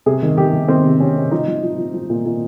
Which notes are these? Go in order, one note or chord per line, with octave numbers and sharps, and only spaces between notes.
C3 G#4
D#3
D#3 G4
D#3
D#3 C4
C3
C3 C#4
C3
F3 D#4
F3
F3
F3
F3
A#2
A#2